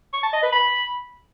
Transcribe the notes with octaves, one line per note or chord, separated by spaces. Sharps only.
C#6
A5
D#5
B4
B5